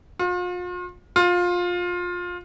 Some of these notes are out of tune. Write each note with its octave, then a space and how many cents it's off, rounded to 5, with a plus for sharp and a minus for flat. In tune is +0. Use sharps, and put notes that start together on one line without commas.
F4 +40
F4 +20